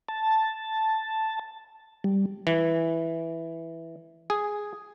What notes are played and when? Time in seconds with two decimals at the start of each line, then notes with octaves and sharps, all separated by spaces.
0.09 A5
2.04 G3
2.47 E3
4.30 G#4